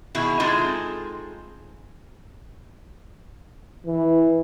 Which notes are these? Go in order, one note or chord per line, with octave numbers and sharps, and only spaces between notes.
B2 D#3 E4 G#4
G#3 C4 D#4 F4 G#4 A4
E3